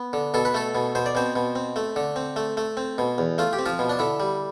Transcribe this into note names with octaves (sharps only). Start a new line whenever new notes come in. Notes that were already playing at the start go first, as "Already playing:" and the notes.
Already playing: B3
D3
B2 A4
B4
A3 A4
B2
B2 C5
D5
B2 C4 C5
B2
C4
A3
D3
C4
A3
A3
C4
B2
E2
A3 F4
G4
C4
F3 F4
B2
D4
D3 E4
G3